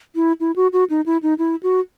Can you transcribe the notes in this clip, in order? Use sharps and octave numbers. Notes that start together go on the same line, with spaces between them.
E4
E4
F#4
F#4
D#4
E4
D#4
E4
F#4